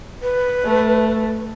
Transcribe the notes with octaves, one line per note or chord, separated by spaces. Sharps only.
B4
A3